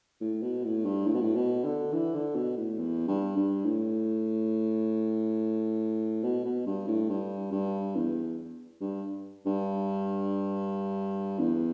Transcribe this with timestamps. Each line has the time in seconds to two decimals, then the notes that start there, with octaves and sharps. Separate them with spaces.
0.21 A2
0.42 B2
0.64 A2
0.85 G2
1.07 A2
1.14 B2
1.21 A2
1.35 B2
1.65 D3
1.92 E3
2.14 D3
2.35 B2
2.57 A2
2.78 E2
3.08 G2
3.37 G2
3.65 A2
6.23 B2
6.45 B2
6.66 G2
6.88 A2
7.09 G2
7.52 G2
7.95 E2
8.80 G2
9.46 G2
11.39 E2